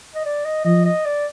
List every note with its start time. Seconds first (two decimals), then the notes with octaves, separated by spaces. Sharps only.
0.15 D#5
0.25 D5
0.45 D#5
0.65 F3 D#5
0.85 D#5
1.05 D5